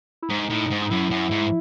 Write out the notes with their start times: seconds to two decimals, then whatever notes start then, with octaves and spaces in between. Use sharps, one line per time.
0.22 E4
0.29 G#2 D#4
0.50 A2
0.70 G#2
0.82 D#4
0.90 F#2 E4
1.11 F#2
1.31 G#2